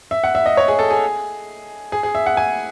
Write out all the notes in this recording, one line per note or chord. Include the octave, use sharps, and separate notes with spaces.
E5
F#5
E5
D#5
C#5
G#4
A4
G#4
G#4
G#4
E5
F#5
G#5